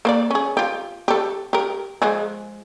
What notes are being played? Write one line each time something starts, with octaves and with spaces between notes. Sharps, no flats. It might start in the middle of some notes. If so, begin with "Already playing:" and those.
A#3 C5 D5
C#4 G#4
F4 G4
G4 A4
G4 A#4
F3 G#3 G#4